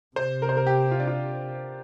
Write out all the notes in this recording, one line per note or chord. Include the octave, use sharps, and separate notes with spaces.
C3 C5
A#4
C5
A#4
G4
F4
D4
F4